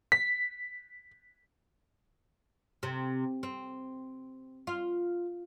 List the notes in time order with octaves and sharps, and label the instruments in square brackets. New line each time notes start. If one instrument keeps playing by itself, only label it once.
[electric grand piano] B6
[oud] C3
C4
F4